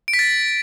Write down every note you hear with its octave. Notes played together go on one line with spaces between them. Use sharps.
D7
B6
A6